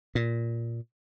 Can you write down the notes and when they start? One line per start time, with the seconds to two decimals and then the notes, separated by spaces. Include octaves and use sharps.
0.15 A#2